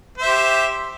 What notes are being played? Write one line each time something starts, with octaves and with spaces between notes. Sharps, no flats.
G4 C5 E5